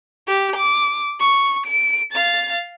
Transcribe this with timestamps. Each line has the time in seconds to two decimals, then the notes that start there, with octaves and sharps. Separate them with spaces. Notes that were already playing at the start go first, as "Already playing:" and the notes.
0.27 G4
0.56 D6
1.20 C#6
1.66 D7
2.13 F5 A6